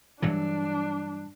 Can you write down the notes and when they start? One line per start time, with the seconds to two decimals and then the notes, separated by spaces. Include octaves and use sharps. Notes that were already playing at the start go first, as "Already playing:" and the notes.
0.22 G2 E3 F#3 D4